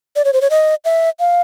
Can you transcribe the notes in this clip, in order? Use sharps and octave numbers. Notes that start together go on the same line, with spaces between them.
D5
C#5
C5
C#5
D#5
E5
F5